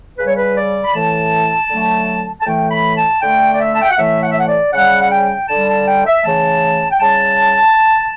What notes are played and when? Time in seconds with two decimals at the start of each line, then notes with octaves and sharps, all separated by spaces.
0.18 C#3 G3 B4
0.27 C#5
0.35 B4
0.56 D5
0.83 B5
0.94 A2 E3 A3 A5
1.70 D3 F#3 A3
2.41 A5
2.46 A2 E3 A3 G5
2.71 B5
2.96 A5
3.22 D3 A3 G5
3.53 D5
3.60 E5
3.74 A5
3.82 G5
3.89 F#5
3.97 A2 E3 A3 E5
4.23 F#5
4.31 E5
4.38 F#5
4.48 D5
4.73 C#3 G3 F#5
5.01 F#5
5.11 G5
5.49 D3 A5
5.54 G3
5.68 A5
5.87 G5
6.06 E5
6.25 C#3 E3 A3 A5
6.91 G5
7.00 C#3 G3 A5